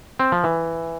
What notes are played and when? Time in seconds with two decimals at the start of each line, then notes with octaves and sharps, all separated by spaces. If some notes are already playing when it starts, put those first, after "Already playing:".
0.19 C4
0.32 F3
0.44 E3